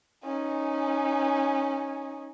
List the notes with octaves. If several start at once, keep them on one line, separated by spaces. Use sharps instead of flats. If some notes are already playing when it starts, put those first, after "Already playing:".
C#4 D#4